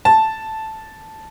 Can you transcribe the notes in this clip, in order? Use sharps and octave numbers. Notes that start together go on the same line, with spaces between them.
A5